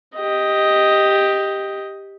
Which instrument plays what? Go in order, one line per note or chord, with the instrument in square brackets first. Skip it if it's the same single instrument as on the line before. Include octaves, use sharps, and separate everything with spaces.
[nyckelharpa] G4 D#5